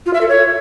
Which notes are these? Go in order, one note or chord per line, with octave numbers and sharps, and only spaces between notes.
F4
E5
A4
C#5